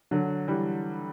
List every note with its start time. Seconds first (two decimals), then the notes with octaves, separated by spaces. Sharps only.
0.11 D3 F#3
0.48 E3 G3